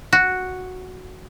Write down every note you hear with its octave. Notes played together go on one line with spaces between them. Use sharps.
F#4